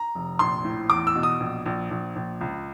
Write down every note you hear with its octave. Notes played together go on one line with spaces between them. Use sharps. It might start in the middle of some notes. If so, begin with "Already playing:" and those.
Already playing: A#5
F1
A#1 C6
A2
E2 D6
E6
B2
D#6
A#1
A#1
A#1
A#1
C#2